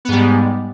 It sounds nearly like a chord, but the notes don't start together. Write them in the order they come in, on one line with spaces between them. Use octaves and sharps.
B3 G#2 G3 G#3